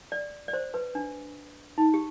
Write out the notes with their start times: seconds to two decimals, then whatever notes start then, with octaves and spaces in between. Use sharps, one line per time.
0.12 D5
0.48 D5
0.53 C5
0.74 B4
0.95 D4
1.78 D#4
1.94 G4